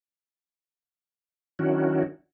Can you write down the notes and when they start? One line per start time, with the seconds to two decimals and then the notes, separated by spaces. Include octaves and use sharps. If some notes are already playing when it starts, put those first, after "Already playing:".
1.59 D#3 F#3 C#4 D4 E4 F#4